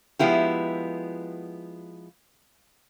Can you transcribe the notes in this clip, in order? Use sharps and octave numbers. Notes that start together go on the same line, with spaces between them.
F3 G#3 B3 E4 G4